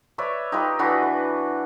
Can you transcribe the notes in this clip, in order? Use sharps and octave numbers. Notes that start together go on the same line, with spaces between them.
B4 C#5 D5 E5
D#4 F4 G4 B4
E3 D4 F#4 B4
B4